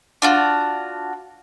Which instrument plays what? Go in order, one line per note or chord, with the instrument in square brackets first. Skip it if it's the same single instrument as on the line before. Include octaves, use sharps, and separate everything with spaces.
[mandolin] D4 F4 F#4